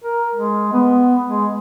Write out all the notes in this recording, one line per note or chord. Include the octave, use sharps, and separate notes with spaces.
A#4
G#3
B3
G#3